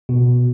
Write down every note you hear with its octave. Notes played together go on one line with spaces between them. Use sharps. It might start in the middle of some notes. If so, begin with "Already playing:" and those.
B2